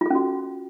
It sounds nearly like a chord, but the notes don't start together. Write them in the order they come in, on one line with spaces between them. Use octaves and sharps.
F4 A4 C#4 F#4